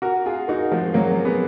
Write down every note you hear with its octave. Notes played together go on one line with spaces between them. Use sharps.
F#4 A#4 F#5
F4 G#4
D#4 F#4 A#4
F3 G#3
F#3 A#3 A#4
G#3 B3